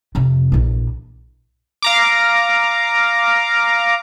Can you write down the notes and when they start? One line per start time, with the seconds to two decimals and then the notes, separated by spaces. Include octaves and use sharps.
0.15 F2 C3
0.52 A#1 E3
1.82 F5 A#5 D6